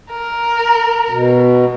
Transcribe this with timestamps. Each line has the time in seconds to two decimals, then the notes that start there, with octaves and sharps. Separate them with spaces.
0.11 A#4
1.10 B2